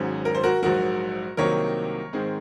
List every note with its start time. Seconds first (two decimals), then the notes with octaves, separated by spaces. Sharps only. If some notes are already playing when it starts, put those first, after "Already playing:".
Already playing: G#1 G#2 F#3 C#4
0.25 A#4
0.35 C5
0.43 F#4 A#4
0.62 A#1 G#2 F#3 F#4 A#4
1.37 C2 C3 D#3 F#3 A#3 A#4 C#5
2.13 G#2 D#3 G#3 C4